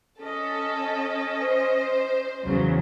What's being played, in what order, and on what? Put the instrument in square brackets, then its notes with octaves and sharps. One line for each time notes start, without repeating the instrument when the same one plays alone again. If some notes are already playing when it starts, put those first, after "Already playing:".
[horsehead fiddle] C#4 D#5 [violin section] A4
[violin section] C5
[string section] E2 C#3 F#3